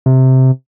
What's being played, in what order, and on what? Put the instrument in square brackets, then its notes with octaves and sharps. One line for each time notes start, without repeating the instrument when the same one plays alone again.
[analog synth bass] C3